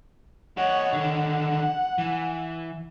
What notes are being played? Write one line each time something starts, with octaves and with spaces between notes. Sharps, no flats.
G4 C#5 D#5 F#5
D3 D#3 F#5
E3